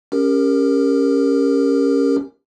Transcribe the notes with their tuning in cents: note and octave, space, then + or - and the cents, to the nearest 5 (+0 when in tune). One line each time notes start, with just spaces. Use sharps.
C#4 +0 G4 +30 A#4 +0